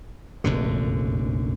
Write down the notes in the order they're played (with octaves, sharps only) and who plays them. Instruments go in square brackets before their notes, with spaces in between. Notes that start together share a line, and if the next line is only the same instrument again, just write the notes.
[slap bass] F1 A#1 F#2 D3